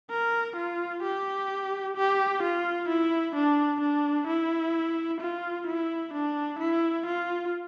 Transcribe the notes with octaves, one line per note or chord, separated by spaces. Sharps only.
A#4
F4
G4
G4
F4
E4
D4
D4
E4
F4
E4
D4
E4
F4